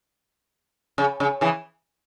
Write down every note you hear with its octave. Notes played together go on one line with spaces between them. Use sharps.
C#3
C#3
C#3 E3